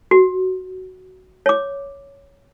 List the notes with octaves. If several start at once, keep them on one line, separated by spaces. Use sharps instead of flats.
F#4
C#5 D6